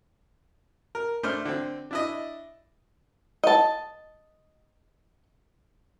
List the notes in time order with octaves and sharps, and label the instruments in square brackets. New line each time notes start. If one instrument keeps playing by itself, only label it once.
[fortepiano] A#4
A3 D4 C5 F6
D3 C4
D4 E4 D#5
[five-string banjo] D#5 A5